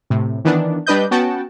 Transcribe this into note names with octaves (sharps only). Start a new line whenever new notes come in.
A2 C3
D#3 E3 B3 D4
G3 D4 B4 D#5 G6
B3 C#4 F#4 F#5 G5 A5